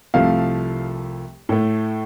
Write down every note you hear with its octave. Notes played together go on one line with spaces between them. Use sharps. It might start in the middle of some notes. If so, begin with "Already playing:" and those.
C2 C3 F3 A3 F5
A2 A3